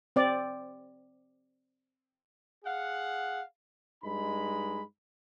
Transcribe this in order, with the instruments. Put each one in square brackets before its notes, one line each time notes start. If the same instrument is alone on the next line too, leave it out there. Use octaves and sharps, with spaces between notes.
[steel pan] C4 D5
[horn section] G#4 F5 F#5
G2 G#3 D#4 B5